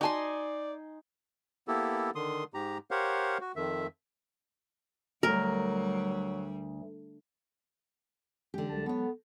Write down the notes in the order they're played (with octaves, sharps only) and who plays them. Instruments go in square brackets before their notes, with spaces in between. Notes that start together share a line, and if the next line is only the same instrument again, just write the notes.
[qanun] D#4 G#5 C6 [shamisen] F#4 A5 [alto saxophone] D5
[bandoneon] A#3 B3 E4 G4 A4
D3 D#3 C6 D#6
G#2 G4 A#5
G4 A#4 C5 C#5 F5 F#5
F#4
F2 D#3 E5
[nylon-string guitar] D2 [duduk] F#3 [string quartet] G3 [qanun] A#4
[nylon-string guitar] D3 G4 [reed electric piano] E3 G#3 C#4
[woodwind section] C2 A5 [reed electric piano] F#3 G#3
[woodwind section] B3 [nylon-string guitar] A4 C#5